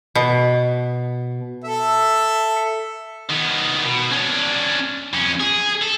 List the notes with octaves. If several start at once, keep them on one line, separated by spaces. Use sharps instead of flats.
B2
A4 E5
D#3 B3
B2
C#4 D4
F2 C#4
G#4
A4